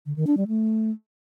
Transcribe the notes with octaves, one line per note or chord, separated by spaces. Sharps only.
D3
D#3
D4
G3
A3